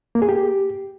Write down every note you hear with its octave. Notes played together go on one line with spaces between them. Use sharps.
A#3
G#4
G4